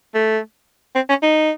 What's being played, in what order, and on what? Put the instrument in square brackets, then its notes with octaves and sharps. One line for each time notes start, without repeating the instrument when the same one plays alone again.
[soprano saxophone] A3
C4
C#4
D#4